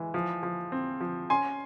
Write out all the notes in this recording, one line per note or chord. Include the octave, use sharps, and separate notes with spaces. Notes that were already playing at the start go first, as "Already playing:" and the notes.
Already playing: E3 G#3
F3
F3
C4
F3
C#4 G#5 C6